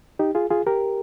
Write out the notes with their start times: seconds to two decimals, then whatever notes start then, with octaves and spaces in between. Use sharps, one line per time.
0.19 D#4 G4
0.35 F4 G#4
0.50 F4 G#4
0.66 G4 A#4